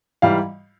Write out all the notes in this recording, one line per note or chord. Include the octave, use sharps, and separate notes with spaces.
G#2 E3 G3 F5